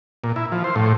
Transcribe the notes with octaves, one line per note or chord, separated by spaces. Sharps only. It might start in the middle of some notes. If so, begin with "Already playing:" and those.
A#2
E4
F3
C5
A2